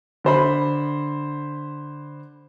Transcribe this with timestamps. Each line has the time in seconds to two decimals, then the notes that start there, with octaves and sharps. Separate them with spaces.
0.24 D3 C5 B5